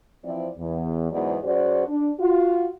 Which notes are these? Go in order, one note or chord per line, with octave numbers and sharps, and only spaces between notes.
E3 F3 C4 E4 D5
E2
E2 G#2 F#3 B3 D5 D#5
F#2 F#4 G#4 C5 D5
D4
F4 F#4